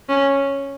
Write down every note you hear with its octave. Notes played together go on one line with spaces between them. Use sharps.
C#4